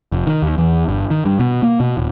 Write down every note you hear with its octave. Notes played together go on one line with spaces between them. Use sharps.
F1
D#3
D#2
E2
G1
D#3
G2
B2
A#3
B2
D#1